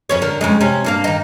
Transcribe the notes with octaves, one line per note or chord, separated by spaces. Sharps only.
F2 C#4 C#5
D3 A#4
F2 C#3 G#3
C3 C#4
G2 A#3 F5
D#3 D#4